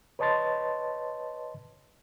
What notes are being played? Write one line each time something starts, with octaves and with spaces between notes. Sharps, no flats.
B4 C#5 D#5 A5 C6 A6